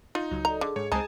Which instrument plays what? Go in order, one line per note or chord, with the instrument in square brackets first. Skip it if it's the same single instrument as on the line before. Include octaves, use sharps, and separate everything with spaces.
[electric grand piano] D#4 [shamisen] F4
[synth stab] C#2 F#3
[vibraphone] A4 D5 D#5 [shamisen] A#5
[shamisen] D3 [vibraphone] G#4
[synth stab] G#2 [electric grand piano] C#5
[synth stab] C#2 G#3 C4 [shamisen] D#4 [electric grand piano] G#5 A5 D#6